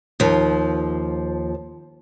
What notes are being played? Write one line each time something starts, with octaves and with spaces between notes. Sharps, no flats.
D#2 F3